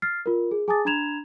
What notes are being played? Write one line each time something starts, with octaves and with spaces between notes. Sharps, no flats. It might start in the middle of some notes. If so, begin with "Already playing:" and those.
F6 A6 C7
F4 A#4
G#4
G#4 G#5 A5 D6 D#6 A6
D4 A#5 B5 G#6 E7 F7